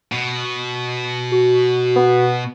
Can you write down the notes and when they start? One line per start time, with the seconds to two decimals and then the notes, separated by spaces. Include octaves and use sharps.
0.12 B2
1.32 F#4
1.96 B3